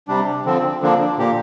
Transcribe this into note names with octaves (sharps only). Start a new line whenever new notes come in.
C3 G3 D4
D3 F3 C4
D3 F3 A#3 D4
A#2 A#3 G4